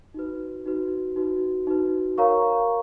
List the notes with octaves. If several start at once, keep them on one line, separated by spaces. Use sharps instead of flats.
D#4 F#4 B4
D#4 F#4 B4
D#4 F#4 B4
D#4 F#4 B4
A#4 C#5 F5 A#5 C#6